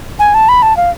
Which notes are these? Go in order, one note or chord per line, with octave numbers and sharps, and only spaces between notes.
G#5
A5
B5
A5
F5